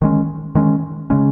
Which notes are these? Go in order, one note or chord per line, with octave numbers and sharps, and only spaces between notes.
D#3 G#3 C#4
D#3 G#3 C#4
C#3 G#3 C#4